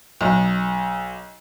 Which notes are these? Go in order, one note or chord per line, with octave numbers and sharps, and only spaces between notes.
B1